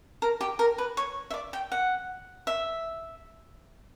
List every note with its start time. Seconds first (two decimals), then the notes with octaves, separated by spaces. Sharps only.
0.22 A#4
0.41 G4
0.59 A#4
0.78 B4
0.97 C#5
1.31 E5
1.34 D5
1.53 G5
1.72 F#5
2.47 E5